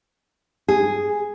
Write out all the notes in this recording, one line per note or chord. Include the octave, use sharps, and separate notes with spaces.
G#4